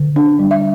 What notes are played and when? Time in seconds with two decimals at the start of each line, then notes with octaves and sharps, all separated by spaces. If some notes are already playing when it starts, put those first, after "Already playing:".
Already playing: D3
0.16 D4
0.39 G3
0.51 E5